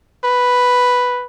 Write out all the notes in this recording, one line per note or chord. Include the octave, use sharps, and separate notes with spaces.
B4